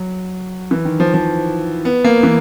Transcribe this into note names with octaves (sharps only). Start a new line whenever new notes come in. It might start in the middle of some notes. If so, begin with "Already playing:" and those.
Already playing: F#3
E3
D#3
F3
F3
B3
A#3
E3